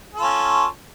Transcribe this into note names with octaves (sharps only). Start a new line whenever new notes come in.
C#4 F4 A4